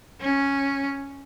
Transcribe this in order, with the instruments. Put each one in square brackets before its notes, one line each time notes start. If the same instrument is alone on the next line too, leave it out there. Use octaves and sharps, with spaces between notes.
[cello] C#4